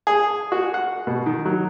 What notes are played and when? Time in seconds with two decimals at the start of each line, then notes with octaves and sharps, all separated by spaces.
0.07 G#4
0.52 F#4
0.74 F#5
1.07 B2
1.26 D#3
1.45 F#3